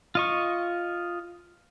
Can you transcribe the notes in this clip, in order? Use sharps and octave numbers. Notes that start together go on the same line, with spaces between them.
F4 D#5 C#6